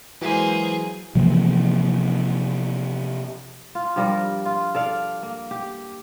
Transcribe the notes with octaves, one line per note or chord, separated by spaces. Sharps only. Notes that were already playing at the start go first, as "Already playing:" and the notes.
E3 F#3 G#3 A#3 G#4 C5
C3 E3 F3 A#3
F4
G2 F3 G3 A#4
F4
A4 D5 F5
A#3
G4